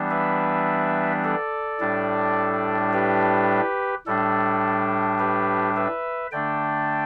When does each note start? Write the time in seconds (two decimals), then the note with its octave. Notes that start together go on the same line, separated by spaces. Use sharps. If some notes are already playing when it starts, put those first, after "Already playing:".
Already playing: E3 G3 B3 D4
0.10 B4 E5
1.24 A4 D5
1.80 A2 G3 D4
2.93 G4 B4
4.06 A2 G3 D4 A4
5.19 G4 B4
5.76 B4 E5
6.32 D3 A3 D4 D5 G5